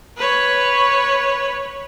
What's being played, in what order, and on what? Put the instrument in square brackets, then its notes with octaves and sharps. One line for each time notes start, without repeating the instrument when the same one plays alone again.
[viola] B4 C#5